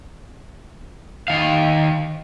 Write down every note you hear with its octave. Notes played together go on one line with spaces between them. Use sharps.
D#3 F5